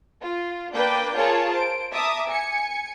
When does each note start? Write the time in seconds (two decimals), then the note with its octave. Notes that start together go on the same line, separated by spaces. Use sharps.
0.22 F4
0.73 A#3 D4 B4 G5 D6 G6
1.16 F4 G#4 A#4 C#5 A5
1.53 C5 D7
1.92 E5 A5 A#5 D6 D#6
2.27 G#5 C#7